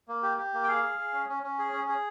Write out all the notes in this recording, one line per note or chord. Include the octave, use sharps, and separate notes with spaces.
A#3
G4
G4
A#3
G5
G#4 F5
G#4
G#4
C#4
C#4
C#4
G#4
C#4
G#4